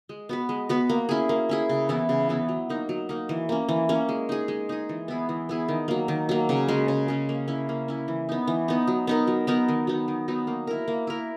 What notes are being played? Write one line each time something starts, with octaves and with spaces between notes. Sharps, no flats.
G#3
B3 F#4 B4
G#3
B3 F#4 B4
A#3
C#4 E4 G#4
A#3
C#4 E4 G#4
C#3
E3 B3 E4
C#3
E3 B3 E4
F#3
A#3 D#4
F#3
A#3 D#4
E3
A#3 C#4
E3
A#3 C#4
G#3
D#4 G#4
G#3
D#4 G#4
E3
B3 E4 G#4
E3
B3 E4 G#4
D#3
F#3 A#3
D#3
F#3 A#3
C#3
G#3 C#4
C#3
G#3 C#4
A#3
C#4 E4
A#3
C#4 E4
E3
B3 D#4
E3
B3 D#4
F#3
B3 D#4 A#4
F#3
B3 D#4 A#4
D#3
F#3 B3 D#4
D#3
F#3 B3 D#4
A#3
E4 A#4
A#3
E4 A#4